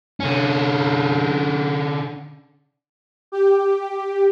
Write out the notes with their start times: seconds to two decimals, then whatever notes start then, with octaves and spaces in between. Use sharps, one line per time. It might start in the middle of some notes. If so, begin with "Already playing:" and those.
0.20 D3 C#4
3.32 G4